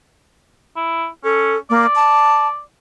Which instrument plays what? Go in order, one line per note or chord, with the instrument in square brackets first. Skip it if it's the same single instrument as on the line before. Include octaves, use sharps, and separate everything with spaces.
[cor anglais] E4
[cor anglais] C#4 [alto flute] A4
[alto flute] A#3 [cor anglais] D5
[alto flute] A5